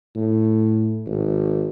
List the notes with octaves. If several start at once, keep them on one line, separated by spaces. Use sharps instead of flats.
A2
G#1